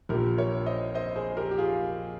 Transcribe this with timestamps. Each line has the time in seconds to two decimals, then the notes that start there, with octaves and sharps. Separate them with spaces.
0.09 A#1 A#2 G4 A#4
0.38 A#4 C#5
0.66 C5 D#5
0.95 C5 D#5
1.16 G#4 C5
1.37 G4 A#4
1.51 G4
1.58 F4 G#4